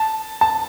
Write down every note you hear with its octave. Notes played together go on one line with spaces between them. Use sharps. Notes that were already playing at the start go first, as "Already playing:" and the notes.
Already playing: A5
A5